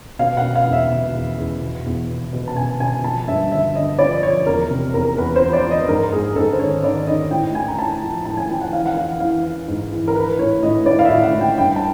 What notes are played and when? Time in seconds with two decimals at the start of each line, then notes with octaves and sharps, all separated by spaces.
0.19 B2 F5
0.37 F#5
0.43 B2
0.55 F5
0.67 E2
0.72 E5
0.90 B2
1.15 E2
1.38 E2
1.62 B2
1.86 E2
2.09 B2
2.33 B2
2.48 A5
2.56 B2 G#5
2.80 B2 G#5
3.04 F3 A5
3.27 G2 E5
3.52 D3 E5
3.75 D3 D#5
3.99 F3 D5
4.23 F3 C#5
4.46 E2 A#4
4.70 C3
4.93 E2 A#4
5.18 E2 B4
5.36 C5
5.41 F3
5.53 D5
5.65 F3
5.71 D#5
5.88 G#2 A#4
6.12 G#2 G#4
6.36 G#2 A4
6.53 C5
6.59 D#3 C#5
6.83 D#3 D5
7.07 D#3 D#5
7.31 A2 G5
7.54 A2 G#5
7.68 A#5
7.78 A2 A5
8.02 F3
8.25 A2 A5
8.37 G#5
8.49 F3 G5
8.61 F#5
8.73 E3 F5
8.86 F#5
8.97 E3 F5
9.20 E3 F5
9.44 E3
9.68 G#2
9.92 E3
10.08 A#4
10.15 E3 B4
10.39 A2 C#5
10.63 A2 D#5
10.86 A2 D5
10.99 F5
11.05 E5
11.10 A2
11.22 F#5
11.34 A2
11.41 G5
11.58 G2 G5
11.76 A5